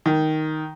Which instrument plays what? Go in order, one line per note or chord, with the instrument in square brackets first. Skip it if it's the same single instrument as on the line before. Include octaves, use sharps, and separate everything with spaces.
[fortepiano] D#3